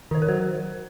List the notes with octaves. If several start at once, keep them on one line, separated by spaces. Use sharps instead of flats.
D#3 C5
A#4
F#3 C5